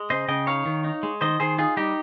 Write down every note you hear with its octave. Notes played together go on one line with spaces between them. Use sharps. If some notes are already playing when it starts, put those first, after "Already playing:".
Already playing: G#3
C#3 C5 D#5
C#3 D#5 G5
D#4 C#5 F5
D#3
D#4
G#3
D#3 C5 D#5
D#3 G#4 C5
D#4 F4 G#4
G3 D#4 G4